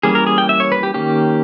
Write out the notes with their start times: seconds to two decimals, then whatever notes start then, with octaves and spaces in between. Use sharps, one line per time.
0.03 E3 G3 A#3 C#4 G#4
0.15 A#4
0.27 G#4
0.38 G5
0.49 E5
0.60 C#5
0.72 B4
0.83 G4
0.94 D#3 A#3 C#4 G4